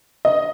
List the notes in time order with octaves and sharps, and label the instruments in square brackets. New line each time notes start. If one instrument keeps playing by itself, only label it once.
[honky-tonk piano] D#5